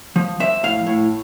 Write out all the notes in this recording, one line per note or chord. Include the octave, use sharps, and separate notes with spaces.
F3
F3 E5
A2 F5
A2